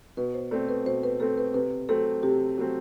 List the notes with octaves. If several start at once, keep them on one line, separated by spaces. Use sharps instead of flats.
B2 B4
C5
A3 C4 D5
B4
B2 C5
B4
A3 C4 A4
B4
C3 B4
F#3 A3 C4 A4
C3 G4
F#3 A3 C4